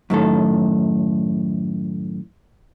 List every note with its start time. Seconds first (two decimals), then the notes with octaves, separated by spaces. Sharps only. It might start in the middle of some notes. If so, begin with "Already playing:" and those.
0.10 F#2 A2 D#3 A4